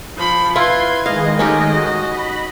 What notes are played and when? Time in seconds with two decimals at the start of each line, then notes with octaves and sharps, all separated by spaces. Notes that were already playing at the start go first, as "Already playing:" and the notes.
0.16 F3 B5
0.56 E4 F4 B4 C6 G#6
1.06 D#3 G#3 D#5 F5
1.39 A3 C#4 D#4 G4
1.73 F#4
2.09 B5